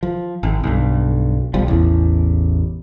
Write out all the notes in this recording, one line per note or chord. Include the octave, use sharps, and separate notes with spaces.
F3
G#1
B1 G2
B1 F3 G3
A1 E2